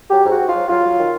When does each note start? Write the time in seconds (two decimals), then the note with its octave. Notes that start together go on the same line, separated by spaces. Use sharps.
0.10 F#3 G4
0.26 G#2 F#4
0.40 G#2
0.49 F4
0.54 F#3
0.68 F#3 F4
0.84 F#3
0.98 D#3